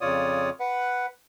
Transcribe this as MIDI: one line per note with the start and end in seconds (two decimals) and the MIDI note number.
0.01 0.50 41
0.01 0.50 49
0.01 0.50 65
0.01 0.50 73
0.01 0.50 74
0.01 0.50 87
0.60 1.06 71
0.60 1.06 78